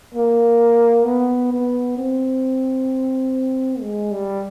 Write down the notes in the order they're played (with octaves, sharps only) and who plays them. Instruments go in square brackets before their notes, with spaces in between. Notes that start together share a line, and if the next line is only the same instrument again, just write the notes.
[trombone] A#3
B3
B3
C4
G#3
G3